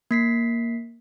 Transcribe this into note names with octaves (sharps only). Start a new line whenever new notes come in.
A#3 B6 C7